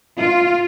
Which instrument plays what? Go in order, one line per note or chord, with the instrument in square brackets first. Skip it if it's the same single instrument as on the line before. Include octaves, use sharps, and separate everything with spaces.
[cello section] F4